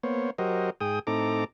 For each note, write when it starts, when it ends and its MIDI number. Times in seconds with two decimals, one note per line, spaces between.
0.03 0.30 58
0.03 0.30 59
0.03 0.30 72
0.03 0.30 73
0.38 0.70 54
0.38 0.70 66
0.38 0.70 67
0.38 0.70 70
0.38 0.70 72
0.38 0.70 75
0.81 0.99 44
0.81 0.99 68
0.81 0.99 79
0.81 0.99 87
1.07 1.44 45
1.07 1.44 60
1.07 1.44 63
1.07 1.44 69
1.07 1.44 82
1.07 1.44 86